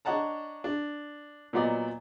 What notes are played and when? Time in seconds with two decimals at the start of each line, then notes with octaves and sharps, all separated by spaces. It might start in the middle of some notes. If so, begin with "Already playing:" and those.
0.05 D4 C#5 D#5 F#5 A5 A#5
0.64 D4
1.53 A#2 F#3 B3 D5 D#5